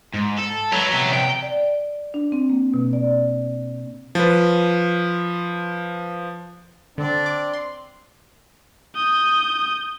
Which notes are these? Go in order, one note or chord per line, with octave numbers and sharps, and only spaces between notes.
G#2
A4
B3 A4 C#5 A#5
C3 B3
G5
D5
D4
C4
A#3
B2
D5
F3 B4
D3 C4 D4 D5
D6
C6
D#6 G6